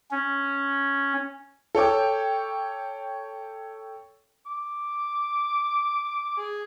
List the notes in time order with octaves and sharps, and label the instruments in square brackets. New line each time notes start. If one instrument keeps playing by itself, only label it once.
[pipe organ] C#4
[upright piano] A4 C#5 G5 D6
[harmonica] D6
G#4